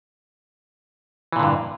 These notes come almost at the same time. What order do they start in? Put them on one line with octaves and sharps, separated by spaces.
E3 A#2 D3 G2